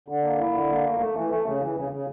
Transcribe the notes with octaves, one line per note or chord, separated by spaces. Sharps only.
D3
A#3
E4
D3
A#3
A3
A3
E3
A3
C#3
E3
C#3
C#3